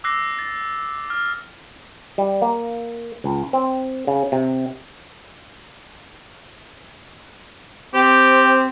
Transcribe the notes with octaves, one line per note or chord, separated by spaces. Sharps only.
D6 E6 F#6 A#6 C7
A6
F6
G3
A#3
C#2
C4
C#3
C3
C4 G4